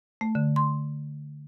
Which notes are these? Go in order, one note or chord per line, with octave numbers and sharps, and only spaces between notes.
A3
D3
C6